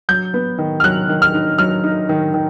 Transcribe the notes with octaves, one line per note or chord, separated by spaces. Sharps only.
F#3 G6
B3
D#3
F6
F#3 F#6
D#3
F6
D#4
F#3 F6
D#4
D#3
D#3